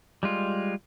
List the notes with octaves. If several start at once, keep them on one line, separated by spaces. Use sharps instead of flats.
G3 G#3 F4